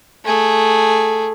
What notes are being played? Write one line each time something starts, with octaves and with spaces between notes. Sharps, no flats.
A3 G#4